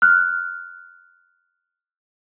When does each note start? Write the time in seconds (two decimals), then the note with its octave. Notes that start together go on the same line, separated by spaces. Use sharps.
0.02 F6 F#6